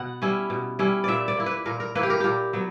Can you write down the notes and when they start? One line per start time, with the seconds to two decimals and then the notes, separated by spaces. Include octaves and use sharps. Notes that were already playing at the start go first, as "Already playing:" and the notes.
Already playing: B2 B3 F#5
0.22 G3 C#4 E4
0.50 B2
0.79 G3 C#4 E4
1.04 A#2 D5 E5
1.28 D5
1.37 A#3 E4
1.46 B4
1.66 A#2 A#4
1.80 A#4
1.95 A#3 E4 B4
2.03 G4
2.10 A#4
2.20 A#2 G4 A#4
2.53 F#3 B3